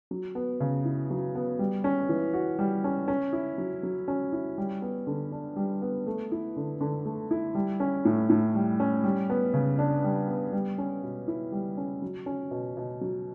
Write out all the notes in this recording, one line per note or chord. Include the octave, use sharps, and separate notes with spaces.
F#3
B3
C#3
E4
F#3
B3
G3
C#4
E3
F#4
G3
C#4
C#4
E4
F#3
F#3
C#4
E4
G3
B3
D3
D4
G3
B3
A3
E4
D3
D3
A3
E4
G3
C#4
A2
A2
G3
C#4
G3
B3
C#3
D4
G3
B3
G3
C#4
B2
E4
G3
C#4
F#3
C#4
B2
B2
F#3